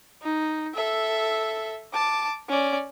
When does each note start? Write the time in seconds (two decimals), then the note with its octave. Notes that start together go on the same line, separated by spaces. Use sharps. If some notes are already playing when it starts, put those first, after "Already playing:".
0.22 D#4
0.75 A4 E5
1.94 A5 D6
2.49 C#4 D5